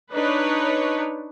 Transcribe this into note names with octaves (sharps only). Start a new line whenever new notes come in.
D4 D#4 B4 C#5